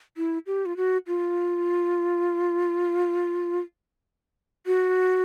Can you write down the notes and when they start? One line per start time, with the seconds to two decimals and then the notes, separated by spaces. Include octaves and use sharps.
0.17 E4
0.47 G4
0.66 F4
0.77 F#4
1.07 F4
4.66 F#4